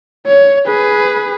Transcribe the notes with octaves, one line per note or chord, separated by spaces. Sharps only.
C#5
G#4 B4